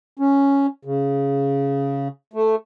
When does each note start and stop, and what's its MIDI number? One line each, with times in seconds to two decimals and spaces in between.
0.19 0.67 61
0.85 2.08 49
2.33 2.55 57